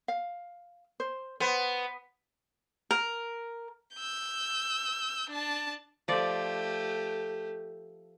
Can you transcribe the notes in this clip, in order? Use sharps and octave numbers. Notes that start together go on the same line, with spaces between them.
F5
C5
B3 C5
A#4
E6 G6
D4 A5
F3 A3 G4 D5